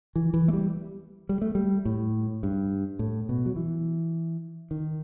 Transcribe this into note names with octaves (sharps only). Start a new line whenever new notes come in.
E3
E3
A3
G3
G3
A3
G3
A2
G2
A2
B2
F#3
E3
D#3